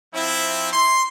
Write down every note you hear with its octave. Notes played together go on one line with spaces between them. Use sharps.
F3 C4 E4
C6